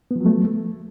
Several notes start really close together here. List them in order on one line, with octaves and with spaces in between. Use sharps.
B3 F3 F#3 A3